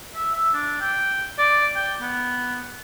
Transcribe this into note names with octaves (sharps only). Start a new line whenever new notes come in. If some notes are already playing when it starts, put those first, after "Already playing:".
E5
E5
D4
G5
D5
G5
B3